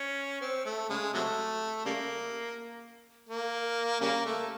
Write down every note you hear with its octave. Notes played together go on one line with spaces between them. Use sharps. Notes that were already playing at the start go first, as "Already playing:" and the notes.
Already playing: C#4
C4
A3
C#3 G#3
C3 F#3 A3
C#3 G3 A#3
A#3
C#3 G3 A#3
A3